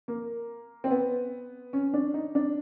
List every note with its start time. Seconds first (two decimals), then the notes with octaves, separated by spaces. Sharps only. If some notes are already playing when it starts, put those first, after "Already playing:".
0.08 A#3
0.84 C4
0.91 B3
1.73 C#4
1.94 D4
2.14 D#4
2.35 D4